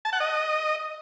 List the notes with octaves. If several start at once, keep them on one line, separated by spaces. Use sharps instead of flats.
A5
F#5
D#5